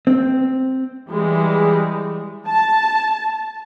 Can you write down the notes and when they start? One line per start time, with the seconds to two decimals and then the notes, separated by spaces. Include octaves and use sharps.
0.07 C4
1.09 E3 G3 G#3
2.47 A5